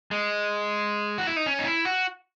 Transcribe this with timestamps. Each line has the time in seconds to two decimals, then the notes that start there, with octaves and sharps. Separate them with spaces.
0.11 G#3
1.18 F#4
1.27 E4
1.36 D#4
1.46 C#4
1.59 D#4
1.65 E4
1.85 F#4